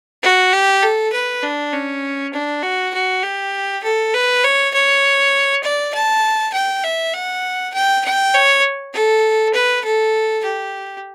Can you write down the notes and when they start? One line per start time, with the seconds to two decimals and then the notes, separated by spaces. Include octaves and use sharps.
0.23 F#4
0.53 G4
0.83 A4
1.13 B4
1.43 D4
1.73 C#4
2.33 D4
2.63 F#4
2.94 F#4
3.23 G4
3.84 A4
4.14 B4
4.44 C#5
4.74 C#5
5.63 D5
5.94 A5
6.53 G5
6.83 E5
7.14 F#5
7.73 G5
8.04 G5
8.34 C#5
8.93 A4
9.54 B4
9.84 A4
10.44 G4